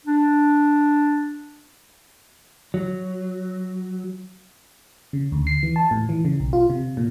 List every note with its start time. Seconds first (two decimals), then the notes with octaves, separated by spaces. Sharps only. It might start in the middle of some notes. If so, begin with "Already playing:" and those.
0.05 D4
2.74 F#3
5.13 C#3
5.32 D2
5.47 C7
5.63 E3
5.76 A5
5.91 A2
6.09 E3
6.25 C#3
6.40 B1
6.53 F4
6.70 C3
6.97 A#2